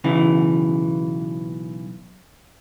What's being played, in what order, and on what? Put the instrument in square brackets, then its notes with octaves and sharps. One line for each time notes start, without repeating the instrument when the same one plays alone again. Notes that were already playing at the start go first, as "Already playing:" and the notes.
[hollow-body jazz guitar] B1 C#3 E3